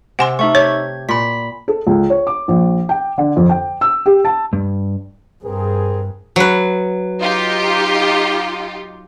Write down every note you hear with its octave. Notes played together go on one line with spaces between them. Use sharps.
C3 F#5 G#5 C6
A3 D#4 E5 C#6
G4 C#5 G#6
A#2 B5 B6
A4
C#2
C#5
D6
A#1
G5
D3
F2
G5
E6
G4
A5
G2
G2 C4 G#4 A#4
F#3 B4
D#4 F4 G4